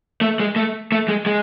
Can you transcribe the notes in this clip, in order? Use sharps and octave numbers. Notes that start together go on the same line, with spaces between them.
A3
G#3
A3
A3
G#3
G#3